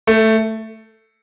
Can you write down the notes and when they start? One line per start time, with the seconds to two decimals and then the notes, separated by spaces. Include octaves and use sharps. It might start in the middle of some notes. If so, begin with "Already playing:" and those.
0.07 A3